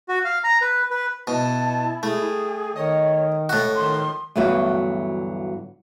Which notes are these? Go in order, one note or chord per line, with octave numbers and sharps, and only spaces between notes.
F#4
F5
A#5
B4
B4
B2 E4 A5
G3 A3 G#4
D#3 C#5 D#5
A2 F#4 C#6
F#2 D#3 F3 C6
D2 G2 E3 F#3 B3 F#4